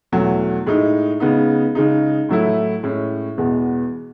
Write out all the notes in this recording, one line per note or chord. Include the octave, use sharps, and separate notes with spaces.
E2 B2 F#3 A3
A2 G#3 D#4
C#3 G#3 B3 D#4
C#3 G#3 D#4
A2 F#3 A3 E4
A2 G#3 C#4
E2 B2 G#3 B3